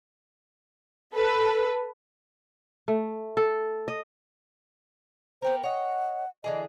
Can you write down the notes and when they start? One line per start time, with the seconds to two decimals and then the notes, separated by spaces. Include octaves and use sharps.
1.13 A4 B4
2.88 A3
3.37 A4
3.88 D#5
5.42 B3 G4 A#4 C5
5.63 C#5 D#5 F#5
6.44 D3 E3 G#4 D#5